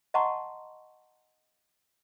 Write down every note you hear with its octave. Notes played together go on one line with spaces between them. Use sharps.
D#5 F#5 A5 A#5 C6 C#6